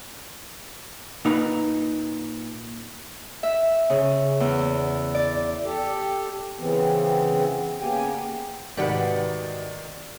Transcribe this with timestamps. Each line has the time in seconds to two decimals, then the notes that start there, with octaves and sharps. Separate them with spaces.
1.25 A#2 D#4 B4
3.43 E5
3.90 C#3
4.40 E2
5.15 D5
5.64 G4 A4
6.59 C#3 E3 B3 C4
7.80 C#3 A#3 B3 G4 G5 G#5
8.77 G#2 C3 D#3 F#4 G4 B4 D5 F#5